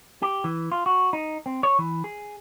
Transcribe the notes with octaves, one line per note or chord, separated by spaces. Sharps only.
G4
E3
F4
F#4
D#4
C4
C#5
E3
G#4